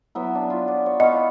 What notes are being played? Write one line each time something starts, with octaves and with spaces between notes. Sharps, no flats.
F#3 B3 E4
D4
F4
D5
C#5
B3 E4 D#5 F5